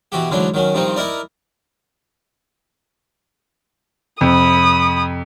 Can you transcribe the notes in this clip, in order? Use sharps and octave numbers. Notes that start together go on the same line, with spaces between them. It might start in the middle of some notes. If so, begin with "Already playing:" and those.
B2 E3 F#4 G4
D2 G#2 E3 F#3 D4
D#3 F#3 C#4
G2 D#3 F3 C4 D#4
D#4 E4 A#4 D5
F2 C3 B5 D#6